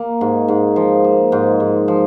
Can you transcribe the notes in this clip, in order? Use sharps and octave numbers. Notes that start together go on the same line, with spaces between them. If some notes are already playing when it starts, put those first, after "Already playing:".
Already playing: A#3
G#2
G#2
F3
A#3
G#2
G#2
F3